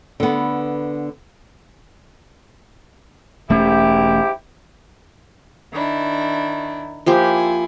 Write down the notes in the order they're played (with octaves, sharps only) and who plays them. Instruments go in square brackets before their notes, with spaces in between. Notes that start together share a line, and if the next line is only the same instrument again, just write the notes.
[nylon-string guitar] D3 B3
[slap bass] E1 A3 C#4 [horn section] G#2 E4 G4
[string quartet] D#3 D4 E4
[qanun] F3 A#3 G4 [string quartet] E4 F4 G#5